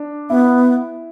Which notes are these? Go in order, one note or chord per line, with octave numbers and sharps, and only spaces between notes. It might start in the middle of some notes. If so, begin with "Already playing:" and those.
Already playing: D4
B3 E4